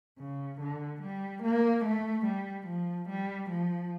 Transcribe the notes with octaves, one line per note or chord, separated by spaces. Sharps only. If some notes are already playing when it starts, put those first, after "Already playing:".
C#3
D3
G3
A#3
A3
G3
F3
G3
F3